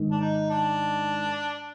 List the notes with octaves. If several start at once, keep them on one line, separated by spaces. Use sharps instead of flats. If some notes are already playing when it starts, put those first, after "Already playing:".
Already playing: G#2 D#3
D4
D#4
D4